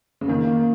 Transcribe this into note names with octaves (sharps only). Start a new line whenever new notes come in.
C#3
D#3 A#3
A#3